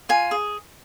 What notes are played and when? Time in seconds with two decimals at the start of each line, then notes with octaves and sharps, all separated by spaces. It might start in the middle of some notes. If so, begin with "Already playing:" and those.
0.09 F4 G#5
0.31 G#4